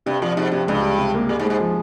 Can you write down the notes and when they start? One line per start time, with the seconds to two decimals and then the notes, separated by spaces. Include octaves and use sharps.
0.06 G2 C3
0.22 A#2 F3
0.36 G#2 C3
0.52 G2 C3
0.68 C#2 G2
0.83 G3
0.99 C3
1.14 A#3
1.29 A#2 G#3
1.39 G#2
1.45 G#3
1.50 G#2
1.60 F3